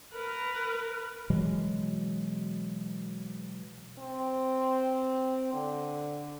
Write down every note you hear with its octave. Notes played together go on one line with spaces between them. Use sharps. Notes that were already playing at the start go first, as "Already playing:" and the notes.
A#4 B4
B2 E3 F#3 G#3
C4
D3